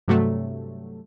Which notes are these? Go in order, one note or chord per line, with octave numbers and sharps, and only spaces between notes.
G2 C3 F#3 A3